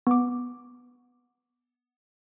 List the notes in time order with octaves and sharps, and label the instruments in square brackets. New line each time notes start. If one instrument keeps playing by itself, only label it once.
[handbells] B3 D6